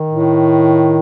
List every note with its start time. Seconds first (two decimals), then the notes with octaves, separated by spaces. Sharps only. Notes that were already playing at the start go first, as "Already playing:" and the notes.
Already playing: D#3
0.10 A2